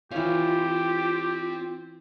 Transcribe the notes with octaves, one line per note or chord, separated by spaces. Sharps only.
E3 C4 F4 G4 C#5 F5